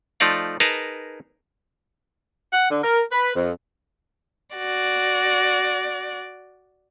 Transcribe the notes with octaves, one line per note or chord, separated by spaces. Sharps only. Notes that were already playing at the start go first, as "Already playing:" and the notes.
F3 A3 D#4 D5 F5
D#4 G#4 A#4 B4 A5
F#5
D3
A#4
B4
F2
F#4 D5